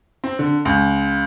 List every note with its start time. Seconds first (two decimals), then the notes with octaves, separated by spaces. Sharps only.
0.24 C4
0.39 D3
0.65 C#2